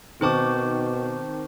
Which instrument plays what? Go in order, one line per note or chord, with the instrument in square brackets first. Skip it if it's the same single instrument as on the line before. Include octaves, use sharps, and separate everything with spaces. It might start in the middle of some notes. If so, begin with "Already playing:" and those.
[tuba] B2 [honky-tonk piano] D#3 C#6 D6 [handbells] C4 C5 A5